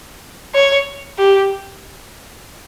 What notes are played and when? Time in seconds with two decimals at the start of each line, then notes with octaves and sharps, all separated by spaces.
0.55 C#5
1.19 G4